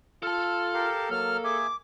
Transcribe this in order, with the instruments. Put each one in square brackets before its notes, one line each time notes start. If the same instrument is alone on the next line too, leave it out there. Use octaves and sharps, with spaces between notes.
[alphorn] F4 [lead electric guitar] A4 A5 [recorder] F6
[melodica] G4 A#4 F5
[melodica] F#3 [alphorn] A#3 [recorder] F6
[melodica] G#4 E5 G#5 [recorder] D6